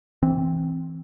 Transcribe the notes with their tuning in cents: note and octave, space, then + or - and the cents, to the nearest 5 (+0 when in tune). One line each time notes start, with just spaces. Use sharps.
E3 -10 C4 +0